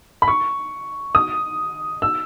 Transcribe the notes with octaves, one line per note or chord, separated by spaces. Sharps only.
B5
C#6
D#6
E6